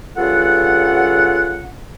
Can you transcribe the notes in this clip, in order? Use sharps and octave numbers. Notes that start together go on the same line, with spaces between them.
G2 C#3 F4 A4 F#5